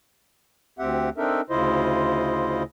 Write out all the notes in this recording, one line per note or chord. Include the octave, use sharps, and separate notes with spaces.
D2 C4 G4 E5 F#5
C4 D4 D#4 A4 A#4 E5
D2 C#3 E4 F4 C5 D#5